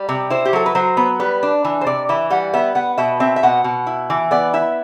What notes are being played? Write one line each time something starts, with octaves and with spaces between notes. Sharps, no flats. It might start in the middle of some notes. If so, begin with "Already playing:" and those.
Already playing: G3
C3
E4 C5
G4
F#3 A4
B4
F#3 C5
B3
G3 B4
D4
E3
C5
C3 D5
E3 E5
G3 F#5
B3 E5
B3 F#5
B2 E5
C4 E5
E5
B2 F#5
B2
E4
E3
B3 D5
E4 E5